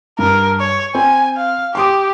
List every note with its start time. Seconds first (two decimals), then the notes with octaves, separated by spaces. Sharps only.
0.19 G2 A#4
0.60 C#5
0.95 C4 G#5
1.37 F5
1.75 G4 C6 D6 D#6